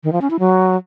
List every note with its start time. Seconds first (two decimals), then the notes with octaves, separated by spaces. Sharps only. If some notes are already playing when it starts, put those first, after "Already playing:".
0.04 D#3
0.13 F3
0.21 C#4
0.30 E4
0.39 F#3